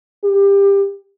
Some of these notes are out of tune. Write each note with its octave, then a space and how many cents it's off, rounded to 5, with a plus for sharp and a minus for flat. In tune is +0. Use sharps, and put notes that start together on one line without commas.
G4 +25